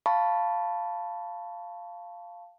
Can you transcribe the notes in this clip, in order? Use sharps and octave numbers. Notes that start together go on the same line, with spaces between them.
F5 A5 B5 C#6